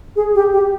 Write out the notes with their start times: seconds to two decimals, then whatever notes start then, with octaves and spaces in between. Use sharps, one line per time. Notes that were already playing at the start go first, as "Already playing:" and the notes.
0.16 G#4
0.35 G4
0.53 G4